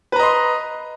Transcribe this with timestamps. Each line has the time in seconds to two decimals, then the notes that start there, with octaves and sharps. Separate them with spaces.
0.12 B4
0.16 A#5
0.20 D#5
0.23 C6